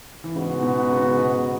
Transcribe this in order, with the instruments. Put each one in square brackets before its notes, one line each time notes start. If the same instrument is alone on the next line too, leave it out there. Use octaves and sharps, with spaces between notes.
[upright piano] E3
[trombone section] G#2 G#3 B3 F#4 [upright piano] C#3
[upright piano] B2
C#3
B2